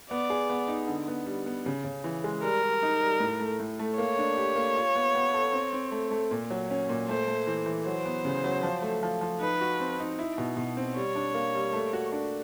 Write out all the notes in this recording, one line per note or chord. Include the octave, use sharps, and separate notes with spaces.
B3 D5
G#4
B3
D#4
D3
B3
G3
B3
C#3
C#3
E3
G#3
G3 A#4
G3
D#4
G3
A2
A3
A2
A3
A#3 C#5
D4
G4
A#3
F4
B3
B3
A4
C4
C4
A3
A3
A#2
F#3
C#4
A#2
A3 C5
A3
E3
E3
F#3 C5
B3
C#3
F#3
F3
A3
F3
F3
D#4 B4
F#4
C4
D#4
E4
B2
B2
C4
G3 C#5
D4
A#3
G3
A3
F#4
D4